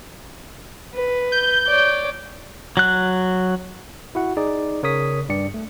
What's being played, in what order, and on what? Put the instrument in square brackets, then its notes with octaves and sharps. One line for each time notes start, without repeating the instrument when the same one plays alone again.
[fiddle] B4
[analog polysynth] G6
[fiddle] C#5 D5
[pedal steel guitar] F#3 F#6
[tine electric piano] E4 F#4 F#5
D#4 G#4 D5
C#3 A#4 C#5 C#6 D#6 B6
G2 D5 C#7
A3